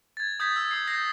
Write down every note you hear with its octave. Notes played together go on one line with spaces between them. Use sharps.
G#6 A6
D#6 G6 G#6 B6
E6
D#6 C7
G6 A#6 C7